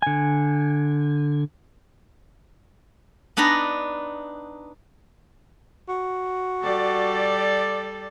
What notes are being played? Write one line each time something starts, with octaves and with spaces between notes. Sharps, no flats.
D3 G#5
B3 D4 D#4 B4 A#5
F#4
G3 A4 D5